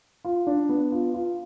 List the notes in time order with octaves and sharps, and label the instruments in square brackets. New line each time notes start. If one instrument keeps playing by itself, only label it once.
[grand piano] F4
D4
B3
F4
F4